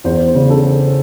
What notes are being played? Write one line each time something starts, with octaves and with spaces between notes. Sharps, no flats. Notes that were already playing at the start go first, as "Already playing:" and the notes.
E2 C5
C5
C#3
A4